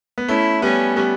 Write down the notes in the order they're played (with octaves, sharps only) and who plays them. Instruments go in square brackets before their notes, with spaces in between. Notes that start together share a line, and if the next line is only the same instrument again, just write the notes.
[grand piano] B3
[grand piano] A3 C#4 [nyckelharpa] E4
[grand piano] G3 B3 [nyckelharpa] C#4
[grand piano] G3 B3